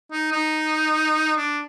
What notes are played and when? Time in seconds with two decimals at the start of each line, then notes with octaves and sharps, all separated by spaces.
0.12 D#4
0.32 D#4
1.37 D4